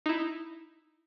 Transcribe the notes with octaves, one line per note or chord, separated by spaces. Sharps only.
D#4 E4